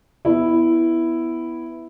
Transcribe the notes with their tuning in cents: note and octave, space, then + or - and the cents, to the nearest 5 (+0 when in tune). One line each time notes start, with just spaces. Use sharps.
B3 +5 E4 +0